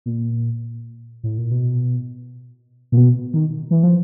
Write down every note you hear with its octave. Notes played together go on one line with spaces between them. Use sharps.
A#2
A2
A#2
B2
A#2
B2
D#3
E3
F3